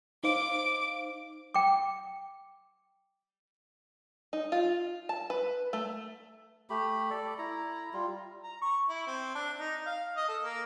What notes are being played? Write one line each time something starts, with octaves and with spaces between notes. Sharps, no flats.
D#4 C5 F5 D6
G5 D6
D#4
F4
A5
B4
A3
A3 G4 B5
A4 D5
E4 A#5
G3 F4
A#5
C#6
E4
C4
D4
D#4
F5
D#5
A4
A#3